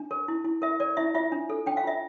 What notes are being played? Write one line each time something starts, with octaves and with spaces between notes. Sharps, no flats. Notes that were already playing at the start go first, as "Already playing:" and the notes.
Already playing: D4
A#4
E4
E4
A#4 E5
A#4 D5
E4 E5
F4 E5
D4
A4
D4 G5
F5
F4 E5